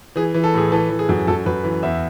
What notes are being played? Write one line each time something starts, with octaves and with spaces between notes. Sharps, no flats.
E3 G#4
E3
A4
A2 G#4
E3 A4
E3
G#4
F#2
F#2 A4
F#2 B4
E3
E2 E5